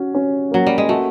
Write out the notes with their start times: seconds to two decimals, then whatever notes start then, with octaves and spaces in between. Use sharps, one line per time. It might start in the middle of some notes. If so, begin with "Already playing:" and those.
Already playing: C#4 F#4
0.15 C#4
0.51 F#3 A#3
0.67 G3
0.78 G#3
0.89 A3 F#4